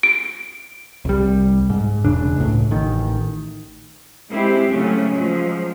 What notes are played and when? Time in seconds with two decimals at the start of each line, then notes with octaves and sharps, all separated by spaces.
0.03 D7
1.05 C2 G3
1.70 G#2
2.04 E1 C#3 D4
2.36 C#2 A2
2.71 A1 D#3
4.30 G#3 C4 E4 G4
4.70 C#3 F#3 A3 C#4
5.14 F3 F#3 G#3